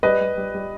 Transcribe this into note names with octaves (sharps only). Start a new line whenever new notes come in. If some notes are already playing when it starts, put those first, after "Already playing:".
G3 B4 D#5
G3
G3
G3